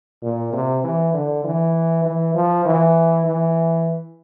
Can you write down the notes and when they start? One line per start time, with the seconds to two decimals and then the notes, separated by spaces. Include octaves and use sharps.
0.23 A#2
0.53 C3
0.84 E3
1.14 D3
1.44 E3
2.05 E3
2.35 F3
2.65 E3
3.26 E3